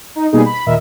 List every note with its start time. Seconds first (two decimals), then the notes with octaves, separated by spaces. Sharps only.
0.16 D#4
0.33 B2 G3 A#3 B3 D#4 G#4
0.46 B5
0.66 D#2 A#2 A#4 D#5 E5